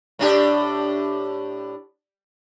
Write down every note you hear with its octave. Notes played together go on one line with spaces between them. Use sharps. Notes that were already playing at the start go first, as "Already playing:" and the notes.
A2 D4 G4